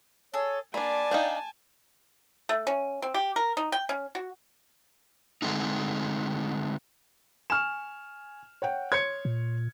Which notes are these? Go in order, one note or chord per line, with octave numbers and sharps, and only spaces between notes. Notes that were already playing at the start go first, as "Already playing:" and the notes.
G#4 A4 C#5
A#3 D4 D5 G#5 A5 B5
D4 D#4 F5 G5 G6
A3
C#4
C4
G4
A#4
D#4
G5
C#4
F#4
D3 G#3 A3 C4 D#4
G#5 C#6 F6 E7
C#5 F#5 G5
C#5 C6 G#6 C#7
A#2